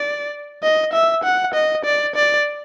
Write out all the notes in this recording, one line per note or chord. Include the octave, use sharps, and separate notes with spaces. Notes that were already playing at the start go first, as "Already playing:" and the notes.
Already playing: D5
D#5
E5
F#5
D#5
D5
D5